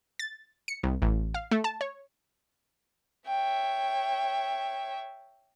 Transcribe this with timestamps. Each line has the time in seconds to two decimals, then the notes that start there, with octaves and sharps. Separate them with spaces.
0.19 A6
0.68 C#7
0.83 C2
1.02 A1
1.34 F5
1.51 A3
1.64 A5
1.81 C#5
3.27 C#5 E5 G5